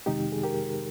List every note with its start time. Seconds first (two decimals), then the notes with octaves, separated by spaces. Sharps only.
0.06 F2 C3 D#3 G#3 D#4 G4
0.32 G#4
0.44 G4 A#4